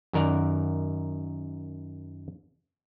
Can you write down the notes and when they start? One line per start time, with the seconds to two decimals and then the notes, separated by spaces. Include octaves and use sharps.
0.13 F#2 D#3 A#4 D5 F#5